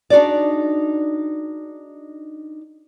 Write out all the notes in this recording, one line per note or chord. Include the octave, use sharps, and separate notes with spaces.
D4 D#4 F#4 G#4 D5